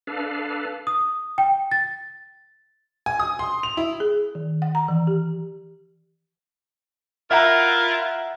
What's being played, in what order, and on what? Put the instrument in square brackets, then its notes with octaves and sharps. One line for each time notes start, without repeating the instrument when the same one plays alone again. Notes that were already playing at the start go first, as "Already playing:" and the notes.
[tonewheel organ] D4 A4 B4 F5
[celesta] D#6
G5
A6
[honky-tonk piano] G#5
D#6
C6
F7
E4
[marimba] G#4
D#3
F#5
A#5
E3
G4
[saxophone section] E4 F4 A#4 [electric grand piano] E5 F#5 A#5